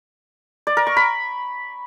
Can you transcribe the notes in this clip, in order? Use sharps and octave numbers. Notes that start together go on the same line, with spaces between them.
D5
A#4
C#6
B5